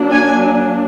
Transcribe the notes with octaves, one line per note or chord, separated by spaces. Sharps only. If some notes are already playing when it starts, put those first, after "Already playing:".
Already playing: F#3 A#3 D4
G#5